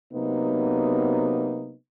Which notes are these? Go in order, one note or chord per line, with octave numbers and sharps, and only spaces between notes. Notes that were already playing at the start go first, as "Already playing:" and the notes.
C3 F#3 A#3 B3 D#4